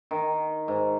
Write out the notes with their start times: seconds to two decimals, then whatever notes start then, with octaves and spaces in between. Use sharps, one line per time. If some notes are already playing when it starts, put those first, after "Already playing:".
0.11 D#3
0.68 G#2